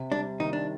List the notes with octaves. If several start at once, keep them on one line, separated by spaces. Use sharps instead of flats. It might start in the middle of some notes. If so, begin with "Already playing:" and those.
Already playing: C3
G3 D4
D#3 D#4
D4